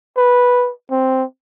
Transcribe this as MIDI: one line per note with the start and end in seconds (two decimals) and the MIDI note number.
0.17 0.71 71
0.91 1.24 60